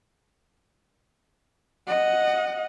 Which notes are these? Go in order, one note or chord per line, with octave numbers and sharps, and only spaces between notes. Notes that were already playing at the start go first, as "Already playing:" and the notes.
D#5 F#5